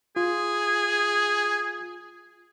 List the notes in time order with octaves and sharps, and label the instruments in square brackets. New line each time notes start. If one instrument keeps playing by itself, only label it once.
[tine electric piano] F4 [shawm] G#4